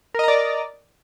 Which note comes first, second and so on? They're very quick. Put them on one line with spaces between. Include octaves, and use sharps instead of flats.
A#4 D#5 A#5 D5